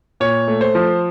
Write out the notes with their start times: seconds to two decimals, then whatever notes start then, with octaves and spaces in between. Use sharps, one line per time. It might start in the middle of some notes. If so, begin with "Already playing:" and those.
0.20 A#2 C#5
0.48 A3
0.61 C5
0.75 F3